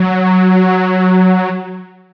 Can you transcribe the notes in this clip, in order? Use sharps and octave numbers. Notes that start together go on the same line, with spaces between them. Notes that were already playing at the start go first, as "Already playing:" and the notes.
Already playing: F#3